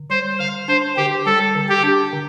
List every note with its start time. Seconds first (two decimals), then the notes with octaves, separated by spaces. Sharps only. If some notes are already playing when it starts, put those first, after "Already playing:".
Already playing: D3
0.10 G3 C5
0.39 D3 F5
0.68 D4 C5
0.97 D3 G4
1.26 G3 A4
1.55 D3
1.69 G4
1.83 D4
2.13 D3